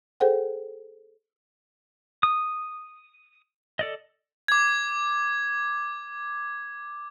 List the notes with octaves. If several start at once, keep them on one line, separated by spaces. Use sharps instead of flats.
G#4 A4 C5 F#5 G5
D#6
A4 D5 D#5
D6 G#6